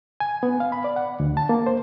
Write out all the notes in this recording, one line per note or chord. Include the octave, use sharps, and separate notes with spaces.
G#5
B3
F5
B5
D5
F#5
D2
A5
A#3
C5